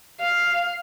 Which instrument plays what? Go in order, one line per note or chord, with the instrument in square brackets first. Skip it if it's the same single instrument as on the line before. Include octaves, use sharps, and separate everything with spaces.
[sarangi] F5